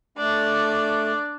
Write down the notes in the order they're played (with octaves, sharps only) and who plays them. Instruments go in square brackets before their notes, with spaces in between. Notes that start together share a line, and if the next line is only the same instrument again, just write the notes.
[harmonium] A3 [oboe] D4 [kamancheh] D5